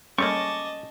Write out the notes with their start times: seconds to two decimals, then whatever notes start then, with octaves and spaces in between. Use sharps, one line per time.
0.19 G3 A3 A#3 C#4 D#5 A5 C#6 D6